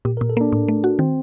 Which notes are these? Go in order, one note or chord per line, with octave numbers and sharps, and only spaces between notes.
A#2 G4
A#4
A#2
A4
A#3 D4
A2
A3
F#4
D#3 C4